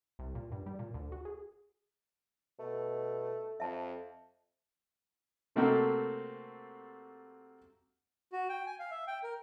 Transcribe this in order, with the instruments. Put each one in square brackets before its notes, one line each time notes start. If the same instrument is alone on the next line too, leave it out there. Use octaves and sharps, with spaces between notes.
[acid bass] C2
A#2
G2
G3
A#2
D2
F#4
G#4
[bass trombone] B2 [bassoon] A3
[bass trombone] F2 [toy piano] E5 A5
[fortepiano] C3 A3 A#3 C4 F#4 A4
[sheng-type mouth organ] F#4
G5
G#5
F5
E5
G5
A#4